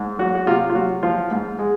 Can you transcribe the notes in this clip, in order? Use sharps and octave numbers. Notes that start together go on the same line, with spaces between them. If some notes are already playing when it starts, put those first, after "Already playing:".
Already playing: G#2
F#3 F#4
F#4
C3 F4
F4
F#3 F#4
F3 F4
G#2
G#3